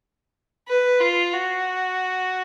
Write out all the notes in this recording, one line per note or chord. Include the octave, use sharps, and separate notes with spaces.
B4
F4
F#4